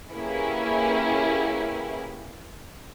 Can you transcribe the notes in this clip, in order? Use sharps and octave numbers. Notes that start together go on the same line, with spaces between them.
A#3 C#4 E4 G4 G#4 B4